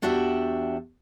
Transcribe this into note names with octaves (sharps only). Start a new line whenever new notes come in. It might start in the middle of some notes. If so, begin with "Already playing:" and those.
E2 D4 F#4 G4 E5